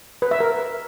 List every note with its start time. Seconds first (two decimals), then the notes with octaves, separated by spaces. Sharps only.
0.22 B4
0.31 E5
0.40 A#4